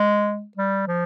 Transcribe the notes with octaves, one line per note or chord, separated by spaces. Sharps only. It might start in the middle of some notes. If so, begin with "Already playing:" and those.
Already playing: G#3
G3
F3